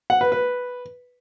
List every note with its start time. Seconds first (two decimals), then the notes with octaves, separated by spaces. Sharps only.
0.10 F#5
0.21 B4
0.32 B4